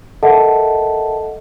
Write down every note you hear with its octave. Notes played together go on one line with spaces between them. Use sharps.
A4 A#4 D#5 E5 F#5 A5